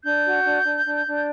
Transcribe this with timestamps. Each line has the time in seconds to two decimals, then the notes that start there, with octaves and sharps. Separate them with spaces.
0.03 D4 G6
0.24 F#4
0.44 D4
0.64 D4
0.85 D4
1.06 D4